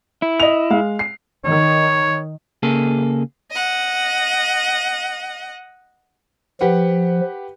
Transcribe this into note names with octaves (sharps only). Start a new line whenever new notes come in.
E4
D#5 F7
G#3 F5
C7
D#3 C#5
C#3 A#3 G#4 A4
D#5 F#5
F3 G4 B4 F#5